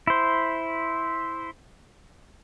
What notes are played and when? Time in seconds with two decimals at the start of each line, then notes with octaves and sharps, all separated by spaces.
0.07 E4 C5